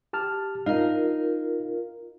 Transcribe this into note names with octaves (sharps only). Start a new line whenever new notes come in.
G4 A5 F6
D#4 F4 A#4 F5